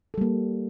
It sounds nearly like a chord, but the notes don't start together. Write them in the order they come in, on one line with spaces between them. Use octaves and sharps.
A4 G3 A#3